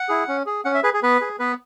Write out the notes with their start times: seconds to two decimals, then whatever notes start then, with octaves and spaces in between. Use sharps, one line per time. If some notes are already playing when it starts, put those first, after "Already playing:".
Already playing: F#5
0.09 E4 G#4
0.28 C#4
0.46 G#4
0.65 C#4 F#5
0.74 E5
0.83 G#4 B4
0.93 G#4
1.03 B3 B4
1.21 G#4
1.39 B3 B4